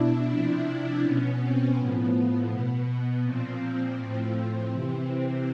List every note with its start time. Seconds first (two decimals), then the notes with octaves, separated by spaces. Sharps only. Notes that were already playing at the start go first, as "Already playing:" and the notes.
Already playing: B2 D4 E4
0.30 C3 F3
1.03 B2 B3 C#4
1.40 C4
1.77 A2 F3 B3
2.50 B2
3.24 A#2 F3 C4
3.98 A2 F3
4.72 C3 E3